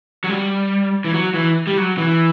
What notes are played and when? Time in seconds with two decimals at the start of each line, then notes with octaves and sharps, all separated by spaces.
0.24 F#3
0.29 G3
1.05 E3
1.14 F#3
1.34 E3
1.67 G3
1.78 F#3
1.97 E3